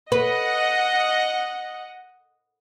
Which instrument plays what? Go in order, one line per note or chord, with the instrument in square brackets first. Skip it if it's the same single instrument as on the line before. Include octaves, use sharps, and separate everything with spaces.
[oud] B4 [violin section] D#5 F#5